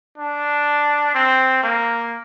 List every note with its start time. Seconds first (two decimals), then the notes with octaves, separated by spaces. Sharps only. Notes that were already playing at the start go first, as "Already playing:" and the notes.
0.18 D4
1.15 C4
1.63 A#3